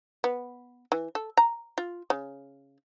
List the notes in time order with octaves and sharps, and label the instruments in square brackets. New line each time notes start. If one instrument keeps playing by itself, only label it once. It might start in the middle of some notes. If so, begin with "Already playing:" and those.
[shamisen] B3
E3
A4
A#5
F4
C#3